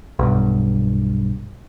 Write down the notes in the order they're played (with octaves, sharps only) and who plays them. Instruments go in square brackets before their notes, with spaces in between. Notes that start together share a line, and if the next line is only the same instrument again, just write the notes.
[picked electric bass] B1 G2